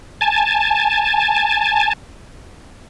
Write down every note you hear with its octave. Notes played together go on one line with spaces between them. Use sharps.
G#5 A5